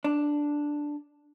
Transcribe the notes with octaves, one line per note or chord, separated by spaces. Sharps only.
D4